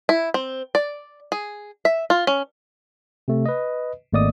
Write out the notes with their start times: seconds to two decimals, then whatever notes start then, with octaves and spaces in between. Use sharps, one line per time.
0.09 E4
0.34 C4
0.75 D5
1.32 G#4
1.85 E5
2.10 F4
2.27 C#4
3.28 C3 A3
3.46 B4 D#5
4.13 G#1 A3 A#3 D5 D#5 D#6